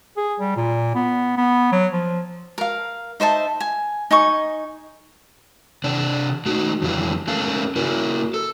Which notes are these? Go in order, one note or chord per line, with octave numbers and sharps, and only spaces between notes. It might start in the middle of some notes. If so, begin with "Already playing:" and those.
G#4
G3
A#2
B3
B3
F#3
F3
A#4 F5
D#4 C5 E5 A5
G#5
D#4 G#5 C#6
C3 D4 D5
A3 D#4 F#4
F2 D3 E3 G3 F4
A3 C#4 A4 A#4 F5
A#3 E4 F#4 A#4
A4